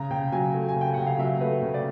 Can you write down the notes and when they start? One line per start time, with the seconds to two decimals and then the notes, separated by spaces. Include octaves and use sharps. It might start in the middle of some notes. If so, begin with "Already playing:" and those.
Already playing: C#3 A#5
0.11 C#3 G5
0.32 F#3 G#5
0.54 A3
0.69 G#5
0.76 C#3
0.81 G5
0.94 C#3 F#5
1.06 F5
1.19 F#3 E5
1.40 A3 B4
1.62 C#3
1.74 D5